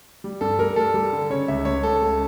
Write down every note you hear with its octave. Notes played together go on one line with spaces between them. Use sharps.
G3
G2 A4
G3 A#4
G3 A4
G3
D3
C#3 C#5
C#2 E5
C#2 C#5
C#2 A4
C#2